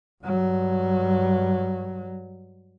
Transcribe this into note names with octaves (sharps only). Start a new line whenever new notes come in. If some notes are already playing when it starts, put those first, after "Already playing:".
G2 F#3